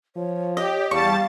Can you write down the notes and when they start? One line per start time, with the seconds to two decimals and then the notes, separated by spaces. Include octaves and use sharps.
0.16 F3 C#5
0.57 G4 D#5
0.91 E2 G3 F5 A5 C#6 A6